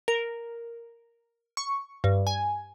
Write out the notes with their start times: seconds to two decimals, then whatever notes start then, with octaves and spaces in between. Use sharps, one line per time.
0.08 A#4
1.57 C#6
2.04 G2
2.27 G#5